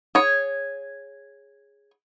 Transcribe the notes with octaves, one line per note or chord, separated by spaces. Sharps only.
G#4 C#5